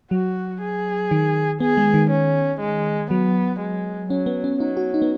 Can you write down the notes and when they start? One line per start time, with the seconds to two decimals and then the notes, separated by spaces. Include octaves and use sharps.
0.11 F#3 F#4
0.61 G#4
1.11 D#3
1.60 B3 G#4
1.77 G#3
1.94 D#3
2.11 C#4
2.61 G#3
3.11 F#3 B3
3.60 G#3
4.10 F#3 C#4
4.26 B3
4.44 C#4
4.60 F#3 D#4
4.77 F#4
4.94 D#4
5.02 B3